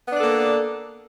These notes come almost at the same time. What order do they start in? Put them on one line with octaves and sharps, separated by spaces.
B3 D4 D5 A4 A#3